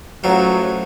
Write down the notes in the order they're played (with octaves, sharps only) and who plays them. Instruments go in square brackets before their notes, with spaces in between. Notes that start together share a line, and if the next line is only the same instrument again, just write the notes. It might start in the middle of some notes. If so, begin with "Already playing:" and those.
[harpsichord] A1 A2 F3 [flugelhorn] F#3